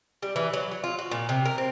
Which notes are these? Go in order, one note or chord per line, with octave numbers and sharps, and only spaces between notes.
G3
E3
F#3
F#3
F4
F#4
A#2
C3
A#4
C4